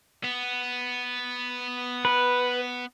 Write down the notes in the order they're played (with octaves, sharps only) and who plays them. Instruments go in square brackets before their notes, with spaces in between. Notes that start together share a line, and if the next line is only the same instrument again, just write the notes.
[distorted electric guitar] B3
[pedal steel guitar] B4